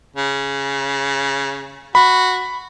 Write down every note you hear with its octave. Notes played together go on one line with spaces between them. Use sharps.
C#3
F#4 B5